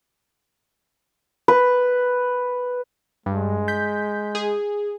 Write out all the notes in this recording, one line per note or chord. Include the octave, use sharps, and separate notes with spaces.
B4
G2 G#3
G6 B6
G#4